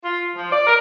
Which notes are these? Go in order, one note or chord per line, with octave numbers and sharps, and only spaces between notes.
F4
F3
D5
A#4